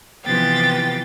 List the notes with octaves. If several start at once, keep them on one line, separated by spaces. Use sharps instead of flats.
C3 E3 F3 B3 G5 A6